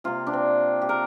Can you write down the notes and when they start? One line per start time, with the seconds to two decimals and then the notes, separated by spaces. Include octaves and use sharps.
0.04 C3 A#3 F4
0.27 D4
0.33 C4
0.82 G4
0.89 A#4